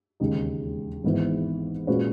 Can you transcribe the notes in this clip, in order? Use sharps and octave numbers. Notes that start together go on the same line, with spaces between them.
E1 D#2 C#3 G#3 D#4
G#1 G#2 E3 B3 E4
A#2 G#3 C#4 F#4 B4